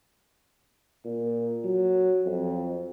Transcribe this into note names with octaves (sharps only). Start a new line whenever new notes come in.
A#2
F#3
F2